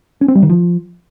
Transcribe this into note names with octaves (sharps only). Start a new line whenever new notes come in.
C#4
C4
G3
D#3
F3